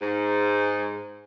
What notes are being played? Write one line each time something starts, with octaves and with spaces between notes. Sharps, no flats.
G#2